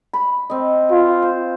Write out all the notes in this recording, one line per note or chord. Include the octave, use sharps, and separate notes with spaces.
B5
C4 D#5
F4
C5